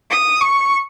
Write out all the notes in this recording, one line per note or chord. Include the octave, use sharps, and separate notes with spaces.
D#6
C#6